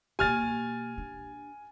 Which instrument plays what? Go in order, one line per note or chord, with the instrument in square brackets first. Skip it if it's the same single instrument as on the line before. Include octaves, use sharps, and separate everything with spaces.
[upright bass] B2 A#3 [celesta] G4 [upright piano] G#5 F6 A6
[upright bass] D4